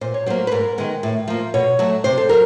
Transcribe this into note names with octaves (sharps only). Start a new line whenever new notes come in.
A#2 C5
C#5
F#3 A#3 C5
B4
G#2 A#4
D#3 G#3 B3
A2
F3 A#3
B2 C#5
F#3 A3
C3 C5
A4
F#3 A#4